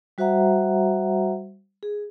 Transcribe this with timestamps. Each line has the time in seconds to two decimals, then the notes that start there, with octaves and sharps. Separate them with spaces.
0.18 G3 F#4 C5 E5 F#5 A#5
1.83 G#4